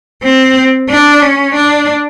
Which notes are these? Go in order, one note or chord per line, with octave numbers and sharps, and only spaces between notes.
C4
D4
C#4
D4